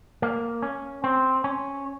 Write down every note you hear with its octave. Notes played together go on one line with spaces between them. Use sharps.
A#3
C#4
C4
C#4